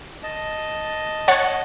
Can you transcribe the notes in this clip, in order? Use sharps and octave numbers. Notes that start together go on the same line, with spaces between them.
D#5 A5
C#5 F#5 A6